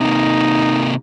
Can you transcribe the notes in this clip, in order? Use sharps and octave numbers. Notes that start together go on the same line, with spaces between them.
C3 A#3 D#4